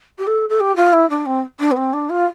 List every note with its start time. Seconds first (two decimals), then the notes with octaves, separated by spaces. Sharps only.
0.18 G4
0.27 A4
0.49 A4
0.60 G4
0.76 F4
0.93 E4
1.09 D4
1.25 C4
1.59 D4
1.71 B3
1.76 C4
1.93 D4
2.09 F4